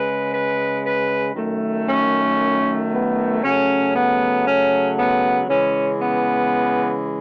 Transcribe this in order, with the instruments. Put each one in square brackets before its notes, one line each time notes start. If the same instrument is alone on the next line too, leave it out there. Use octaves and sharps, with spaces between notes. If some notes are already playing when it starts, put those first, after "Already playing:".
Already playing: [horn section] C#3 G#3 B4
B4
B4
F#2 D#3 A3
C#4
B3
C#3 F#3 A3 C#4
B3
C#4
B3
C#3 E3 G#3 C#4
B3